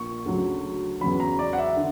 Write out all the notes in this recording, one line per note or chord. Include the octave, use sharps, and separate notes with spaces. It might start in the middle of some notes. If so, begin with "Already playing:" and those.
Already playing: A#1 A#2 C#6
D2 C#3 F#3
E2 C#3 F#3 B5
A#5
D5
F#5
E5
D3